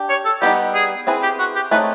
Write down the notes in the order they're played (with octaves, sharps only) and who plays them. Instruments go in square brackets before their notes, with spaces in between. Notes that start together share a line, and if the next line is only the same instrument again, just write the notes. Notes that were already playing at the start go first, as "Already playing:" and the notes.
Already playing: [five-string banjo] D4 G4
[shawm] C#5
A4
[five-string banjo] G3 B3 D#4 [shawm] G4
[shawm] G#4
[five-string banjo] C4 E4 G#4 B4
[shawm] G4
F#4
G4
[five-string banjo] A3 C4 D#4 G#4 C#5 [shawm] B4